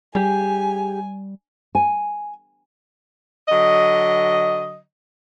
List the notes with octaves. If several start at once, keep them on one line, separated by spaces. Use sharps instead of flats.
G3 G4 G#4 G#5
G#5
D3 F#3 D#5